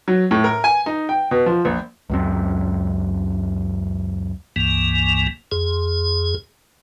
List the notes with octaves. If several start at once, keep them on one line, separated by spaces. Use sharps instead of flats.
F#3
A2
A#4
G#5
D#4
G5
B2
F3
A#1
C#2 F#2 C4
C#2 G2 E3 A#3
F2 G#4